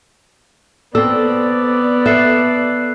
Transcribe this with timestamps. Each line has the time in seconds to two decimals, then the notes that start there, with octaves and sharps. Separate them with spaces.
0.95 B3 C4 A4 D5 E6
2.06 A4 E5 F#6 C7